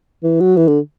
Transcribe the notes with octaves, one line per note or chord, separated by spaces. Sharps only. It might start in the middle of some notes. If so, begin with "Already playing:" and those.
E3
F#3
E3
D3